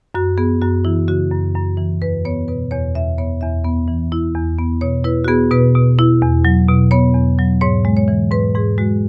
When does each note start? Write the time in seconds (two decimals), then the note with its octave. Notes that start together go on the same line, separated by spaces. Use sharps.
0.15 F#2 F#4
0.37 B3 G#4
0.62 F#2 F#4
0.85 E3 E4
1.08 C#3 F#4
1.31 F#2
1.55 F#2
1.77 E3
2.02 E2 B4
2.25 B3 C#5
2.48 B2 B4
2.71 E2 C#5
2.95 E2 E5
3.18 B3 C#5
3.41 E2 E5
3.65 B3
3.88 E3
4.12 E4
4.35 E2
4.59 B3
4.81 B2 C#5
5.04 E4 B4
5.24 F#4
5.28 B3 G#4
5.51 B2 B4
5.75 B2
5.99 E4
6.22 E2
6.45 F#3
6.68 B2
6.91 B3 C#5
7.15 E2
7.39 F#3
7.61 G#2 C#5
7.85 G#3
7.97 C#5
8.08 E3
8.31 G#2 B4
8.55 G#2 G#4
8.78 G#3 F#4